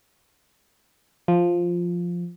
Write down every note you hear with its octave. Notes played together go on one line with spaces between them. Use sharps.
F3